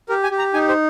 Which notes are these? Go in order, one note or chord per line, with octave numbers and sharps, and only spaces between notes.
G4 A#4
G#5
G4
A#5
D#4 G#5
C5